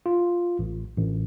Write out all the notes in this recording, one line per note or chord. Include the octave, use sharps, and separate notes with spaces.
F4
A1
A1